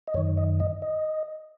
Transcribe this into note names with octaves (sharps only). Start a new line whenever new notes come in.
D#5
F#2 D#3 C#5
D#5
D#5
D#5